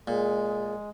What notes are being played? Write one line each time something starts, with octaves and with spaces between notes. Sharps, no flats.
A#2 G#3 G#4